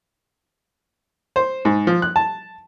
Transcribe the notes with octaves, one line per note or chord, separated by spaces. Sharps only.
C5
G#2
F3
F#6
A5